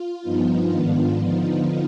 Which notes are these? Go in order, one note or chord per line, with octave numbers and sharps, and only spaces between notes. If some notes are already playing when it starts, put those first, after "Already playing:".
Already playing: F4
G2 F3 B3 D#4
G#2 D#3 B3 D4 F4
D3 F3 B3 D#4 F4